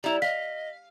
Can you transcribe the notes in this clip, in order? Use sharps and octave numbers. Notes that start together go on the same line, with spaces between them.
G3 E4 A#5
D#5 F5 B6